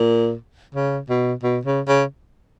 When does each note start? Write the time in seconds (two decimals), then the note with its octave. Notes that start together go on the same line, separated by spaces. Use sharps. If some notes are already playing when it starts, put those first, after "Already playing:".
Already playing: A#2
0.75 C#3
1.10 B2
1.43 B2
1.65 C#3
1.88 C#3